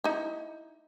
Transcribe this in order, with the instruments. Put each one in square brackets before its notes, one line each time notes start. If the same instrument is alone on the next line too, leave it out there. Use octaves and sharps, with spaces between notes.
[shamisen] D#4 E4